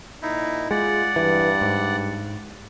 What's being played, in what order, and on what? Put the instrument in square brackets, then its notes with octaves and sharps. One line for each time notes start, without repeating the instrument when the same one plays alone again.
[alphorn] A#2 [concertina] D#4 E4
[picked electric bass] G#3 [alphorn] F4 [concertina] D5 F#5
[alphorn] G2 [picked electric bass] E3
[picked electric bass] G#2